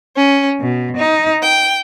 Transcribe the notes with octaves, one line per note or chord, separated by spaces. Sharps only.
C#4
B2
D#4
G5